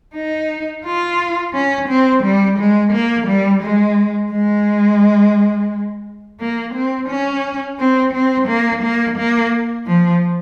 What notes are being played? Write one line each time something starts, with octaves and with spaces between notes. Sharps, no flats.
D#4
F4
C#4
C4
G3
G#3
A#3
G3
G#3
G#3
A#3
C4
C#4
C4
C4
A#3
A#3
A#3
F3